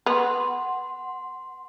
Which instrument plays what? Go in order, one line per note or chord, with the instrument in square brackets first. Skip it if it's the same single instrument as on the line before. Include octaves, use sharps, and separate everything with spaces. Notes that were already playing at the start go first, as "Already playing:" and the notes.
[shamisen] B3 [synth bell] F#5 C6